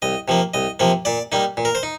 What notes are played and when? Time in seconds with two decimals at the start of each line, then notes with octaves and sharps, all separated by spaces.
0.02 C2 D#5
0.28 C3 F3 A#3
0.54 C2 D#5
0.80 C3 F3 A#3
1.05 A#2 D5
1.32 G3 A#3 D#4
1.57 A#2
1.65 A#4
1.75 C5
1.83 D#4